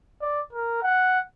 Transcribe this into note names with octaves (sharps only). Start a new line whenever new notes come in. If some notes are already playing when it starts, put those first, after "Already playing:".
D5
A#4
F#5